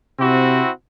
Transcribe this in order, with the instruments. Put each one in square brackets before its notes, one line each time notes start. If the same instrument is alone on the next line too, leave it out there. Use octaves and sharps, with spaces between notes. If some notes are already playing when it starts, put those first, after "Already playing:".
[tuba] C3 [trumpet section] C4 E4 F#4